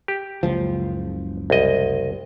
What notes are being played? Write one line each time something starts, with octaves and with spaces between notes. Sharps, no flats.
G4
F#1 C#2 F3
C2 D#5